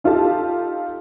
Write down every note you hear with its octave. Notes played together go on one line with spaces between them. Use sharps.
D#4 F4 G4 A4 A5